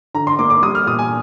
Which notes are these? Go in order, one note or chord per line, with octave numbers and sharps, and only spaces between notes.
D3 A#5
C6
A#3 D6
D6
G3 D#6
F6
A#2 D#6
G#5